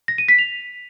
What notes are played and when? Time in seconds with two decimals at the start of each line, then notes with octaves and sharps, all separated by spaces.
0.08 A#6
0.18 D#7
0.28 B6
0.39 F7